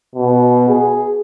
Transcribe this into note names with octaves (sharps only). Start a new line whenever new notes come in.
B2
G#4